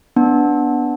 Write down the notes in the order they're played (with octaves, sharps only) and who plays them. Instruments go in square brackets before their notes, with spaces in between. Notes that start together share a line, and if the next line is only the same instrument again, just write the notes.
[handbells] B3 D4